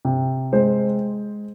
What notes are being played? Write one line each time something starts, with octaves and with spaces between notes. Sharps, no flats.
C3
G#3 C5